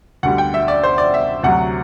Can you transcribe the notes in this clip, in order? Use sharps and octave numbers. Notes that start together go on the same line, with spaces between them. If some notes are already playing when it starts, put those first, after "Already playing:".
D2 D3 G3 F#5
G5
E5
D5
C5
D5
E5
D2 C3 F#3 F#5